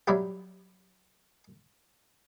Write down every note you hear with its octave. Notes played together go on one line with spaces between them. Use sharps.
F#3 G3 E4 F4 G4